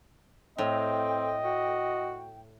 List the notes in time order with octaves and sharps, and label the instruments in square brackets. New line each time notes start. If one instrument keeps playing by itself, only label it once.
[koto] A2 [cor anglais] C4 [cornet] D#5 [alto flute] G5
[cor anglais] F#4